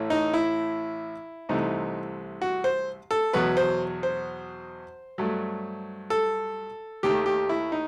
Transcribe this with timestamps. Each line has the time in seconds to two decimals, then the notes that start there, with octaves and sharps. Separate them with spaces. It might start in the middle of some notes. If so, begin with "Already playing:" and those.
Already playing: A1 A2 E3 A3
0.10 D#4
0.34 E4
1.49 C2 C3 E3 A3 D#4
2.42 F#4
2.64 C5
3.11 A4
3.33 E2 B2 F#3 B4
3.57 C5
4.03 C5
5.18 G2 F#3 A3
6.10 A4
7.03 D#2 D#3 A3 G4
7.26 G4
7.49 E4
7.72 D#4